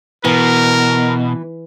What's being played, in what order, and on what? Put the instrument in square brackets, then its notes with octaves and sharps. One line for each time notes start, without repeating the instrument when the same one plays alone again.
[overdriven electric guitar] B2 [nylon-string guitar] E3 [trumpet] A#4